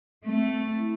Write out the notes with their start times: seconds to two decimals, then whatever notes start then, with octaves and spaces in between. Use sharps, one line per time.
0.24 A3 C4
0.77 E4